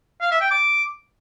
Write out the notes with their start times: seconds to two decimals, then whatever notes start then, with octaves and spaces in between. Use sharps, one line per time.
0.21 F5
0.31 E5
0.41 G5
0.51 D6